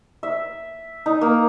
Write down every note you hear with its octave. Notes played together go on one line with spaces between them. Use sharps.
E5
D#4
A#3